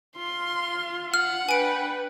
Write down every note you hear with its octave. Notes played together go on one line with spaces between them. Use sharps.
F4 F5 C6
F#5 F6
D4 B4 G5 G#5 D7